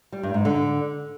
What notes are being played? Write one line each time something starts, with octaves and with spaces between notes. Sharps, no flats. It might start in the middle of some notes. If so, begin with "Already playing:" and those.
G3
G2
G#2
D3